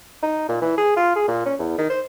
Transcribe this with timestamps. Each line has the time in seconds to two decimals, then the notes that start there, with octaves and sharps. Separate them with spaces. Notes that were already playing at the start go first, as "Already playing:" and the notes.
0.23 D#4
0.49 A#2
0.62 E3
0.78 G#4
0.97 F4
1.16 G#4
1.28 A#2
1.45 C#4
1.59 E2
1.78 D#3
1.90 C5